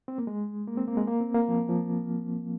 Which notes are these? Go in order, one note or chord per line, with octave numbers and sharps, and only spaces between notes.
C4
A#3
G#3
A#3
C4
A#3
G#3
A#3
C4
A#3
F3
F3